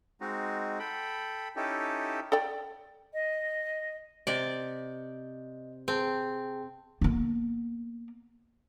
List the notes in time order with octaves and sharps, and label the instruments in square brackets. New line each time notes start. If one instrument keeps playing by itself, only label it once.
[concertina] G#3 C4 D#4 F#4
A4 G5 B5
C#4 D#4 E4 G4 A4
[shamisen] A4 D5 G5
[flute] D#5
[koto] C3 D5 [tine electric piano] D#5
[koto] C4 [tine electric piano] G#4 G5 A5
[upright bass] A#3 B3